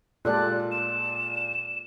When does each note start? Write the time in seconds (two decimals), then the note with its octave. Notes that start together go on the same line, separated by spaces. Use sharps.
0.25 A#2 G#3 F4 G4 A4 D5 F#6
0.71 E7